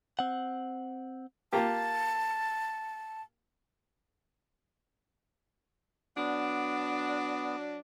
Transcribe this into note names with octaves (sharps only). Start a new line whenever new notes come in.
C4 F#5
A#3 F4 G4 A5
F#3 B3 D4